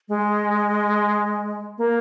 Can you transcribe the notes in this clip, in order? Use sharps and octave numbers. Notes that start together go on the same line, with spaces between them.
G#3
A#3